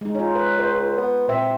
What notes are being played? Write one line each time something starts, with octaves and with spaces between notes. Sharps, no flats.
G#3 D#4
C#4 D#4 F4
B4
C#2 C5
B3
A#2 C4 E5